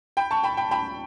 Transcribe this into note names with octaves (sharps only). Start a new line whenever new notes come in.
G5 B5
A5 C#6
G5 B5
G5 B5
G5 B5